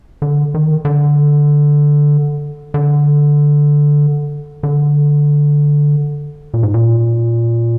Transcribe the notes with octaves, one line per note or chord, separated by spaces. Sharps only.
D3
D#3
D3
D3
D3
A#2
G#2
A#2